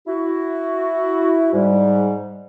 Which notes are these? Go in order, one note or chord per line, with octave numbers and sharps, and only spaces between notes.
E4 F#4
G#2 G3